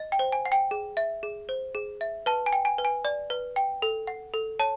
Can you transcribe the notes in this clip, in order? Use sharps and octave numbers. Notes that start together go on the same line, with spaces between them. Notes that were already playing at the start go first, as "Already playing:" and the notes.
Already playing: D#5
G5
C5
G#5
F#5
G5
G#4
E5
G#4
C5
G#4
E5
B4 A5
G#5
G5
G#5
B4
G#5
D5
B4
G5
A4
F#5
A4
C#5 A5